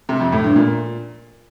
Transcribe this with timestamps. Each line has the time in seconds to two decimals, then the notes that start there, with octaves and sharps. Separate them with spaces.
0.09 C3
0.21 F2
0.32 A2
0.44 G2
0.56 A#2